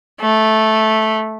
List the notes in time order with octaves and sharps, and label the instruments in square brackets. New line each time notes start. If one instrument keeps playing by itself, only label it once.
[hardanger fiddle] A3